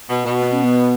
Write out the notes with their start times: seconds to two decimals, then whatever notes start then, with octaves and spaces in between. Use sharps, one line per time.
0.09 B2
0.25 B2
0.41 B3
0.52 C#4
0.64 B3